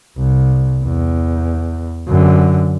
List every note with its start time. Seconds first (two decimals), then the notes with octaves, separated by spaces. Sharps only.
0.17 C2
0.85 E2
2.08 F#2 D3